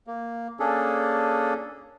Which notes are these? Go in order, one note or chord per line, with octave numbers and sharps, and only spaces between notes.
A#3
A#3 C#4 D4 G#4 A4